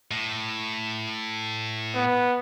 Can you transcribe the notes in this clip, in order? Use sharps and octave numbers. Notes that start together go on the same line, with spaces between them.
A2
B3